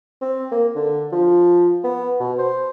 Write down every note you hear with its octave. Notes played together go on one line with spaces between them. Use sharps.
C4
A#3
D3
F3
B3
B2
C5